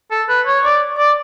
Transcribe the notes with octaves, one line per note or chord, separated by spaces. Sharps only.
A4
B4
C#5
D5
D5